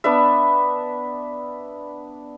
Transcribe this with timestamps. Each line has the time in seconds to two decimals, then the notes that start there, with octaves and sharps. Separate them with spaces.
0.04 B3 D4 D5 E5